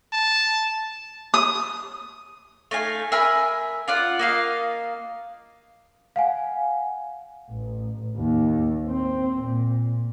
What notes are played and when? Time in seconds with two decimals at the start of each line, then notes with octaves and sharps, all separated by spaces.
0.13 A5
1.34 D#6
2.71 A3 D#4 F5 G#5
3.12 A#4 E5 G#5 B5
3.88 F4 D5 F#5
4.19 A#3 D#5 F5
6.16 F5 F#5 G#5
7.53 A1
8.17 D#2
8.90 C4
9.45 A#2